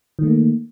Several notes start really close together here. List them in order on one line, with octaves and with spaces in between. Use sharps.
D#3 A3 A#3